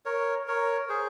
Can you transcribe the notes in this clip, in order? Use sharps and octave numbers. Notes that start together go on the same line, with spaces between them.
A#4 C#5
A#4 C#5
G#4 C5